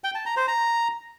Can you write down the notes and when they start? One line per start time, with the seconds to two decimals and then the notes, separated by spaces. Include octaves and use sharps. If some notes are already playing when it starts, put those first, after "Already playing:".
0.04 G5
0.15 A5
0.26 A#5
0.37 C5
0.48 A#5